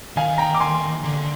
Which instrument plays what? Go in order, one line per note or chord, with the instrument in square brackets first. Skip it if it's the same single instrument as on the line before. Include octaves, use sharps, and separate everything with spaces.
[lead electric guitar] D#3 [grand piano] F5 G#5
[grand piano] G5 A#5
D6
G#5 C6
[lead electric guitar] D3